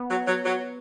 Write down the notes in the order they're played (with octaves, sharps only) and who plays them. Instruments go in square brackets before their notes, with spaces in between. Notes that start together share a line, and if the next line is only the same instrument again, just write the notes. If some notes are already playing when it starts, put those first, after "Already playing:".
Already playing: [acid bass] B3
[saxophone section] F#3
F#3
F#3